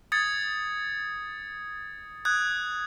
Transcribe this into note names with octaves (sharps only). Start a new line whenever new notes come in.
D#6 G#6 A6 C#7
D#6 F#6 G#6